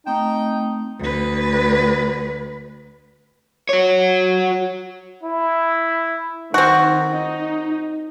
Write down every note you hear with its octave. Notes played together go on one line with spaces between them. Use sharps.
A3 C4 D#4 G5
D2 B4
F#4 C#5
E4
D#3 C4 F#4
D#4